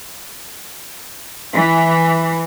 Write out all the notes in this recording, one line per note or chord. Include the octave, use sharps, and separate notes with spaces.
E3